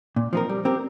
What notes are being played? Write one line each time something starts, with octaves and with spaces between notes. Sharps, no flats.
A#2
F3 C4 D#4 A#4
G3
C4 G4 A#4